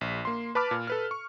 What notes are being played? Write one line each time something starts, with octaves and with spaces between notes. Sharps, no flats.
A#1
A#3 C6
B4 A5 B5 D6 F6
A#2
A4 B4 F6
C#6